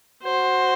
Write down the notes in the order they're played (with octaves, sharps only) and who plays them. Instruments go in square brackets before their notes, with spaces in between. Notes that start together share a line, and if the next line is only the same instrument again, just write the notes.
[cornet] F#4 [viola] C5